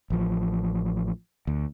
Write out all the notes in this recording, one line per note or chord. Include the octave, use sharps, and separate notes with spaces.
A1 F3
D2